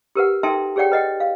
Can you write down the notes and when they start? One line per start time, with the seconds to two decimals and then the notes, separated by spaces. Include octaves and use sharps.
0.15 G4 A#4 B4 F#5
0.43 D#4 A4 E5 G5 A5 C6
0.76 G4 G#4 C#5 D5 F#5 G5
0.92 B4 D#5 F#5 G5
1.20 F5